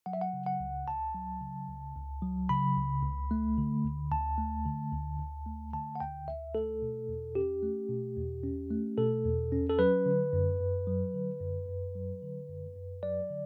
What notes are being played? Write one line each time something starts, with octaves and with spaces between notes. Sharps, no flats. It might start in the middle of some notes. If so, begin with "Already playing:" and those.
F#3 F#5
E5
F#5
C#3
F#5
C#2
C#2 A5
F#3
C#3
C#2
C#2
F#3
C#3 B5
C#2
C#2
A3
D3
D2
D2 A5
A3
D3
D2
D2
A3
D3 A5
F#5
D2 G5
D2 E5
A3 A4
B2
E2
C#4 G4
A3
B2
E2
C#4
A3
B2 A4
E2
C#4
A4
F#3 B4
D3
F#2
F#2
F#3
D3
F#2
F#2
F#3
D3
F#2
F#2
F#3 D5
D3